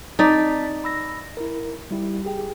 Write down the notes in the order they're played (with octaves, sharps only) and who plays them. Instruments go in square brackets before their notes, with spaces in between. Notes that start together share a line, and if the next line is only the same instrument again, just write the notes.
[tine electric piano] C4 A5 B6 [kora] D#4 D5
[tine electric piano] B5 E6 A#6
E4 A#4
G3 E4 G4
G4 G#4 G5